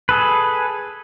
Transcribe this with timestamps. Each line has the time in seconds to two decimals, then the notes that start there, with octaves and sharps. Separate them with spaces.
0.09 G#4 A4 B4